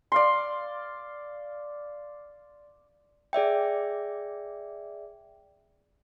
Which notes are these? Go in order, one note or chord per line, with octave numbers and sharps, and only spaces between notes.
D5 F5 C6
G#4 D5 E5 G5